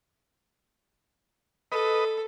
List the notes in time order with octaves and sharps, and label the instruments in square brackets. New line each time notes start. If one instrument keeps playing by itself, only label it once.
[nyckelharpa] A4 [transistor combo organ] B4 D#5